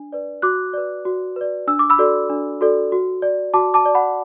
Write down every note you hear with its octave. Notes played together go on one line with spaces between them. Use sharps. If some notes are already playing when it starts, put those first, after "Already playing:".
Already playing: D4
B4 D5
F#4 D6 F#6
B4 D5
F#4
B4 D5
D4 E6
D6
B5 E6
F#4 A4 D5
D4
F#4 A4 D5
F#4
D5
F#4 A5 D6
A5 D6
D5
F#5 B5